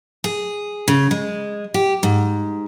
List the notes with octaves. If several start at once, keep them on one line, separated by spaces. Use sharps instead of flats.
G#4
C#3
G#3
G4
G#2